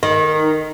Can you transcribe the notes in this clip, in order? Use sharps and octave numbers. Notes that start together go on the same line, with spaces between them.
D#3